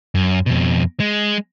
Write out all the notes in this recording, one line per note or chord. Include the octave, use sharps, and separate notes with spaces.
F#2
F2 B2
G#3